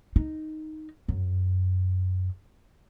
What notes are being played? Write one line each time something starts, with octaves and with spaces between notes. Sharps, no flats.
D#4
F#2